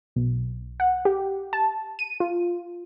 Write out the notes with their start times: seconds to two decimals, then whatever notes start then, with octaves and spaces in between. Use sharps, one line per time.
0.16 B1
0.80 F#5
1.05 G4
1.53 A5
1.99 D#7
2.20 F4